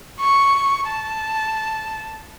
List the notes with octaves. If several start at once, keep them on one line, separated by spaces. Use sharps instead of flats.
C#6
A5